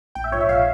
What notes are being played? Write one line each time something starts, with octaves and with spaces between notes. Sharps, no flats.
A#1 G5
E5
G#2 F3 C#5
E5
A#1 F5